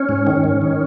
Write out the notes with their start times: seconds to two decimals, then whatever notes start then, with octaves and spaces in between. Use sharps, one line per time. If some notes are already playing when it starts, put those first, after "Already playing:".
Already playing: C#4
0.09 G#2
0.27 D#3
0.44 G#2
0.61 D#3